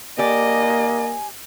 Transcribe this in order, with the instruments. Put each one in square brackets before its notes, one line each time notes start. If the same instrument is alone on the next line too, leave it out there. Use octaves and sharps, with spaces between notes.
[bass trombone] A#3 [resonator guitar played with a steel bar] G4 D5 [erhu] D#5 [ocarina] G#5